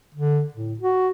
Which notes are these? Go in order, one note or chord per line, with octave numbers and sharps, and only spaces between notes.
D3
A2
F#4